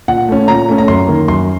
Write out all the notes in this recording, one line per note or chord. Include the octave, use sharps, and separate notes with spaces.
A#2 F#5
A3 C#4
A#2 A#5
A3 C#4
A#5
F#2 C6
D#3 A#3
F#2 C6